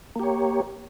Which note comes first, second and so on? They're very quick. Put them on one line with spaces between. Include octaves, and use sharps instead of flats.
A#3 G4 C#5